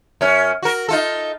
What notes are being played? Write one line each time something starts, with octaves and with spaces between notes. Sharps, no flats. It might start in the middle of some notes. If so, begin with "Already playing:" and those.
F#2 C#4
F#4 A#4
D#4 F4 A4